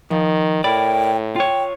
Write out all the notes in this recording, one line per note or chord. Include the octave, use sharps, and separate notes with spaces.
D#3 F3
A2 A#4 D5 G5 B5
F4 C#5 G5